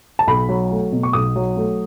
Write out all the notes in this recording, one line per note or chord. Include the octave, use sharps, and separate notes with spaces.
A5
B1 B5
F#3
A3
B2
C#6
B1 D#6
F#3
A3